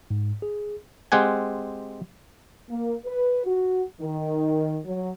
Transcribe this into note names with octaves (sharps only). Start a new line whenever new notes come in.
G#2
G#4
G#3 C4 G4 F#5 G#5
A#3
B4
F#4
D#3
F#3